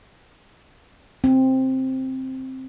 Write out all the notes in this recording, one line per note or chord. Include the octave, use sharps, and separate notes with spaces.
C4